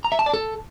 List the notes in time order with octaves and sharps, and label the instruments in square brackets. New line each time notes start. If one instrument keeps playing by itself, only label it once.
[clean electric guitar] A#5
E5
A5
D5
A4